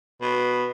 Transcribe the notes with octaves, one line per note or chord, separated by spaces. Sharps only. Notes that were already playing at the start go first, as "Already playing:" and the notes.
B2